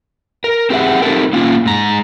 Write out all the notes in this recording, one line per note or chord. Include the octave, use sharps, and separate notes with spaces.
A#4
C4 G4 G#4 D5 E5 F#5
C4 D#4 E4 G4 A4 A#4
A#3 C#4 F4
G#2 A#5